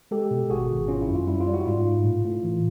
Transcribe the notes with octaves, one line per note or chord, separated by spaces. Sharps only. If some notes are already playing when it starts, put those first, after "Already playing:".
G#3 G4 A4
B2
G#1 F#4 G#4
G#1
C#4 F4
E4
F#2
F4
G3 E4
F4
G3
E4 F#4
G#2 F4
G#2
A2
A2
E3